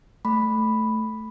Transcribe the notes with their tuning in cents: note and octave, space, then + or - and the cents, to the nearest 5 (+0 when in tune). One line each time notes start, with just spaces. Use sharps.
A3 +0 B5 +0